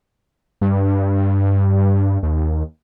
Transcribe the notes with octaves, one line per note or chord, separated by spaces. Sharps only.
G2
D#2